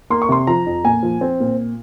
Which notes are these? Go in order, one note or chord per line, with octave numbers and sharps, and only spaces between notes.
A#3 C6
C#6
C3 C6
F3 A#5
F2
A#2 G#5
F3
C4
A#2